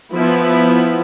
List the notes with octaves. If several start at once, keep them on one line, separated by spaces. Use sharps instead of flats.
F3 B3 E4